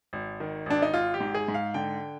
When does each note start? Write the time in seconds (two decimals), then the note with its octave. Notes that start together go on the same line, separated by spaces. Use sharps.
0.13 G#1
0.40 D#3
0.66 G#1 D4
0.82 D#4
0.94 G#1 F4
1.14 G4
1.20 G#2
1.35 G#4
1.48 G#2
1.54 F5
1.74 D3 G5